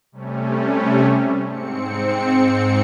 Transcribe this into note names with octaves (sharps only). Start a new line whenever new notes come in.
C3 G3 A3 C#4
G#2 C4 C#7